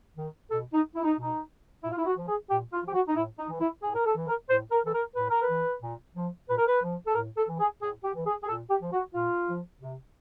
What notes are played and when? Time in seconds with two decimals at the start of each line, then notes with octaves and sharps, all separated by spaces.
0.17 D#3
0.51 B2 A4
0.73 D#4
0.95 E4
1.04 D#4
1.17 B2 D#4
1.84 A#2 E4
1.91 F4
1.98 E4
2.06 F#4
2.17 F3
2.28 G#4
2.50 A#2 G4
2.73 F4
2.83 F3
2.88 G4
2.94 F#4
3.08 D#4
3.16 A2 E4
3.39 D#4
3.50 E3
3.61 E4
3.83 A2 G#4
3.95 A#4
4.06 A4
4.16 E3
4.27 A#4
4.49 A2 C5
4.72 A#4
4.83 E3 A4
4.94 A#4
5.16 A2 B4
5.30 A#4
5.43 B4
5.49 E3
5.83 A#2
6.16 F3
6.48 A#2 B4
6.58 A#4
6.67 B4
6.82 F3
7.07 A4
7.15 A2 A#4
7.37 A4
7.49 E3
7.60 G#4
7.82 A2 G#4
8.04 G4
8.15 E3
8.26 G#4
8.42 G#4
8.48 A#2 A4
8.70 G4
8.81 F3
8.93 F#4
9.14 A#2 F4
9.48 F3
9.81 C3